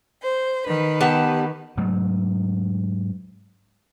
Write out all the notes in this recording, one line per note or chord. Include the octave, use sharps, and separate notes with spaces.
C5
D#3 B4
B3 G4 A5
G#2 F#3 A3